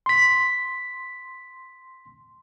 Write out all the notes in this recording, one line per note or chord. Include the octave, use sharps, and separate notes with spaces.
C6 B6